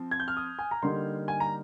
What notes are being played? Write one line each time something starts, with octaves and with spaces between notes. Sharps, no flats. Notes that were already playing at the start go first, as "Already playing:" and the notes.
Already playing: F3 C4
G#6
G6
F6
D#6
G#5
A#5
D3 G3 A#3 D#4 C6
G#5
A#5